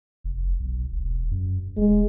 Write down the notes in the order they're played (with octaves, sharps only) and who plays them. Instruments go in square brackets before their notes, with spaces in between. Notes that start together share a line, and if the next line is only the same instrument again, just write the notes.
[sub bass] F1
B1
E1
F#2
[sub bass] E1 [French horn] G#3